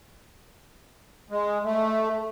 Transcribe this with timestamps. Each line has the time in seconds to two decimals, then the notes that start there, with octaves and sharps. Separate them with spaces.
1.30 G#3
1.64 A3